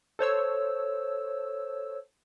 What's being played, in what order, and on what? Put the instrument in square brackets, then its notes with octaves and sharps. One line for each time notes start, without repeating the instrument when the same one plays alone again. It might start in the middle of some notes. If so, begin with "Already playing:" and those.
[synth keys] A4 C5 C#5 E6